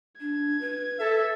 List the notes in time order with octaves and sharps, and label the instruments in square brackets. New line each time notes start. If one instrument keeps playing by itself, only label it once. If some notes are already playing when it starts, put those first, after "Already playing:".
[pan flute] D4 [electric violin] G#6
[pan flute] B4
[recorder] A4 [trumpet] E5